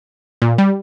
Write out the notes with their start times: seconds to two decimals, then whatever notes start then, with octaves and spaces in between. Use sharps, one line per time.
0.42 A#2
0.58 G3